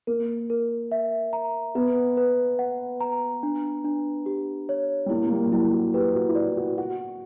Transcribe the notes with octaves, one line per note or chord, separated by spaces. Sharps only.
A#3 A#4
A#4
E5
A#5
B3 B4
B4
F#5
A#5
D4
D4
G4
C#5
G3
A#3 E4
A#3
G3
F#3
G3 E4
F#4
G4 B4
F#4
E4
F#4 D5
F#4
F#4 F#5